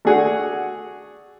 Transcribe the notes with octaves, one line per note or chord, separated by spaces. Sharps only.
A3 D4 F#4 G#4 F#5